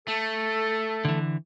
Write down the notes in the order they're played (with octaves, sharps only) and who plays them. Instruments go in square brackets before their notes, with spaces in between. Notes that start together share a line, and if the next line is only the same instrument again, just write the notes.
[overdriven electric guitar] A3 [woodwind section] A4
[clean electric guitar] D3 E3